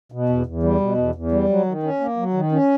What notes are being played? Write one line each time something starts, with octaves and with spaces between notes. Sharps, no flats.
B2
E2
E2
G3
B2
E2
E2
G3
F#3
D#3
C#4
A#3
F#3
D#3
C#4